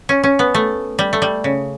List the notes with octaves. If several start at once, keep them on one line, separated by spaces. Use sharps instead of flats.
C#4
C#4
B3
A3
G3
A3
G3
C#3